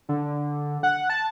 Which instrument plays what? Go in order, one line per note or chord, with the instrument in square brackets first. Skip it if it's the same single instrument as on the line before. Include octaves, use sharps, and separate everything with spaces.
[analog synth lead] D3
F#5
A5